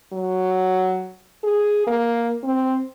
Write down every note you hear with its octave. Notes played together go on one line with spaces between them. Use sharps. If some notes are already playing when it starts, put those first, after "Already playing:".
F#3
G#4
A#3
C4